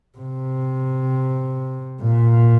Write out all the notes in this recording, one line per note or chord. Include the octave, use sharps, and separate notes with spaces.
C3
A#2